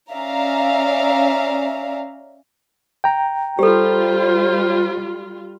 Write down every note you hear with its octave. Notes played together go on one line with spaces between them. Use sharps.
C#4 D5 E5 F5 A#5
G5 A#5
G3 F4 G4 A4 C5